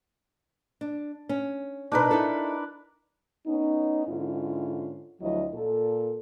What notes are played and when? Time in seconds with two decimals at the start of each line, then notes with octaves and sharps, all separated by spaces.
0.81 D4
1.29 C#4
1.92 B2 D4 D#4 A#4 B4
2.11 D#4 E4 A4
3.47 B3 C#4 D#4
4.06 G#2 D3 C#4 E4 F4
5.21 D2 F3 F#3 E4 D#5
5.54 A#2 A4